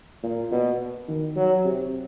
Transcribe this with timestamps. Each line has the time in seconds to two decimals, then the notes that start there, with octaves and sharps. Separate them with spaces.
0.23 A#2
0.51 B2
1.08 D#3
1.35 F#3
1.64 C3